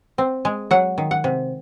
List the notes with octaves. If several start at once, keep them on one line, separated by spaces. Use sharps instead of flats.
C4
G#3
F#3 F#5
D#3
F#5
C3